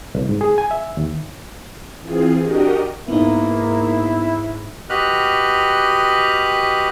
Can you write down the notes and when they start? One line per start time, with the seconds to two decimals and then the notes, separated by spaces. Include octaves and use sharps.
0.15 C2
0.29 G#2
0.41 G#4
0.58 G#5
0.71 E5
0.97 D#2
2.00 E3 C4 F4 G#4
2.43 D4 F#4 G4 A#4 D#5
3.08 G#2 A#3 B3 D#4 E4
4.90 F#4 G4 B4 D#5 F6 F#6